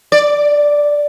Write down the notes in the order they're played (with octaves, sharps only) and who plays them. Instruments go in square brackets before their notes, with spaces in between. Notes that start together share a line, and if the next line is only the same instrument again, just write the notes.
[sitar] D5